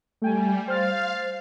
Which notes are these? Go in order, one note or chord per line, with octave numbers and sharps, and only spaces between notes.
G3 A3 G5 G#5
C5 F5 F6 A6